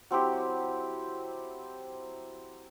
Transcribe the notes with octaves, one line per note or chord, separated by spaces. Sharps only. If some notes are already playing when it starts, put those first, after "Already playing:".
F#3 C4 E4 G4